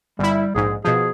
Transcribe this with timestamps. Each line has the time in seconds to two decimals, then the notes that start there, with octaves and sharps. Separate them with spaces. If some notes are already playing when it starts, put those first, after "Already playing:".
0.19 G1 G3 E4
0.55 A#1 G#2 G#4
0.85 B2 F3 G#4